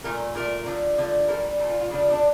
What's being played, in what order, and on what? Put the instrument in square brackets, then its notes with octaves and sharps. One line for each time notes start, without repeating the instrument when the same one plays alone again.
[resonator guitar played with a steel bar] A#2 A3 A#4
A#2 A3 A#4
D3 F3 A3
D3 F3 A3
A#2 G3 A#4
A#2 G3 A4
F4
F4
C#3 F3 A3 D4
D4